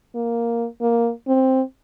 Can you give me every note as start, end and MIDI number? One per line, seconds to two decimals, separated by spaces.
0.15 0.66 58
0.81 1.10 58
1.28 1.62 60